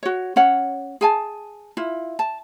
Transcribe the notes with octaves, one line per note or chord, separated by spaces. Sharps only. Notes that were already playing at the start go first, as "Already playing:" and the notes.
F#4 C#5
C#4 C#5 F#5
G#4 G#5 A5
E4 F4
A5